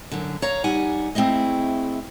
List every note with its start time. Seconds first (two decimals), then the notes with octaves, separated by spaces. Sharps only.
0.12 F#2 D3
0.42 C#5 F5 A#5
0.64 G3 D#4 F#5 G#5
1.15 A3 C4 E4 G#4 D#5